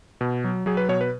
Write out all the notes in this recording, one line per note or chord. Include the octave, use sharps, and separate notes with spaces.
B2
F#3
F#3 G#4
B4
B2 C#5
B4